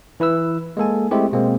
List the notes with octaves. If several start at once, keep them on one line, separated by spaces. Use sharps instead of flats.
E3 E4 B4 E6
G#3 A#3 A4 G#5
G#3 A3 C4 E4 G4
B2 G#3 A#3 C4